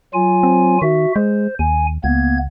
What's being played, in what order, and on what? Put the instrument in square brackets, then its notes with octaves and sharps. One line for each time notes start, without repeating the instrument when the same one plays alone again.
[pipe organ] F#3 F4 G#5
[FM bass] C4
[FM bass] D#3 [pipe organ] F#4 E5
[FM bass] G#3 [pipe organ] C5
[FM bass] D#2 [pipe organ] G#5
[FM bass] C#2 [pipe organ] A#3 B3 G#6